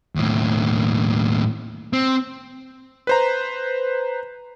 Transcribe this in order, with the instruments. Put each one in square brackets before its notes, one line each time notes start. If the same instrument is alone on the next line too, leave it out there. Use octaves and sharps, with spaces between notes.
[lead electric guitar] D#2 A2
C4
[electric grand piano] B4 C5 A#5